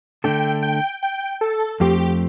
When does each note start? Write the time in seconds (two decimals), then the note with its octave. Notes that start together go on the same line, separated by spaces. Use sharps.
0.24 D3 A3 D4 A4 G5
0.63 G5
1.03 G5
1.41 A4
1.80 F2 F3 A3 C4 G4